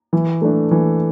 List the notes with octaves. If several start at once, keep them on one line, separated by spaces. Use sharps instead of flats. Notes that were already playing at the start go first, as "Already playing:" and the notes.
E3
A3 D4
E3